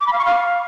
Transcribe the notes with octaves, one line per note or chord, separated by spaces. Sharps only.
D6
B5
F5
C#6
F5